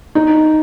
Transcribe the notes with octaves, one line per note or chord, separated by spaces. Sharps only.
D#4